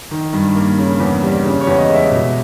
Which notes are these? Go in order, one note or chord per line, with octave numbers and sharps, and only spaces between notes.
D#3
G2
A#3
C#3
E2
G3
C#3
C#5
E2
D#5
G#3
E5
B2